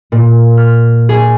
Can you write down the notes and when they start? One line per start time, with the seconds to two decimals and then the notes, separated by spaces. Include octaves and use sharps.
0.12 A#2
0.57 F6
1.09 G#4